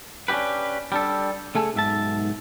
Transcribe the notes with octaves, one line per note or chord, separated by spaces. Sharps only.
C#4 D4 F4 G4 B4
G3 D4 A4
C#3 A3 G#4 A4
B1 G#2 E5 A5